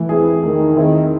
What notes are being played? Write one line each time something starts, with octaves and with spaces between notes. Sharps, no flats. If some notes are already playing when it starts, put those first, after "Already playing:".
Already playing: E3 A3
C4 E4 G#4
D#3 A3
D#3 C4 E4 G#4